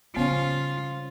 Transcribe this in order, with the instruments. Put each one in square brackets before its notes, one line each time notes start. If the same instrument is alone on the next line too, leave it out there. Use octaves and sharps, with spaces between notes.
[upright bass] C#3 G3 [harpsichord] F3 C#4 [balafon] B3 [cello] F4